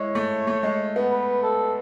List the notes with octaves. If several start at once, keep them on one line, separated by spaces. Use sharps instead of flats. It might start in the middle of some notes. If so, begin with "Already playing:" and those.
Already playing: G#3 E4 C#5
A3
A3
G#3
B3
B4
A4